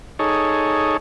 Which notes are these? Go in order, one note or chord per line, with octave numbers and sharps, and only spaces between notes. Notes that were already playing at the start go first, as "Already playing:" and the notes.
D#4 G#4 A4 C#5